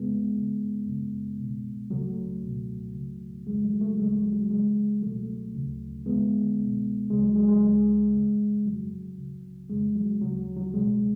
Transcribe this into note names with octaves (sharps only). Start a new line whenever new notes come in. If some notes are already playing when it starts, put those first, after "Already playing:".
Already playing: F2 C#3 G#3 B3
F#2 C#3
F#2 C#3
C#2 B2
C#2 C#3 F#3 A3
C#2 B2
C#2 C#3
F2 C#3 G#3
F#3 A3
F#3 A3
D2 C#3 G#3
F#3
F#3
F#3
C#2 C#3 G#3
C#2 B2 F#3 A3
D2 C#3
F2 D3 G#3 B3
C#2 B2
D2 C#3 G#3
F#3
G#3
G#3
D2 C#3
F#2 C#3
F2 C#3 F#3
C#2 C#3
F2 C#3 G#3
F#3
D2 C#3 F#3
F#3
C#2 B2 G#3